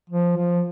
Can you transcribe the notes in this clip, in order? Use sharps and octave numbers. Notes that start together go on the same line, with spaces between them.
F3
F3